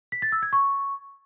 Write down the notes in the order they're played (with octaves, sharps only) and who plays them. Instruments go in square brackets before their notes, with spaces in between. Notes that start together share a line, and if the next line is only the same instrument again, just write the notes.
[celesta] B6
A6
E6
G#6
C#6